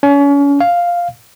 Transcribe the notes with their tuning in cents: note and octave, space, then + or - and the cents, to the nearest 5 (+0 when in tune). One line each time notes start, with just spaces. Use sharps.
C#4 +35
F5 +0